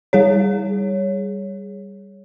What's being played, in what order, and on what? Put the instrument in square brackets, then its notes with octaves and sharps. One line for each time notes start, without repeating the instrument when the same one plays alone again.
[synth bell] G3 G#4 C#5